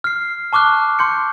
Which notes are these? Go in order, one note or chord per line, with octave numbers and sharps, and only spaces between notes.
F6 C7
A5 C#6 D6 F6 F#6
C6 G6 C#7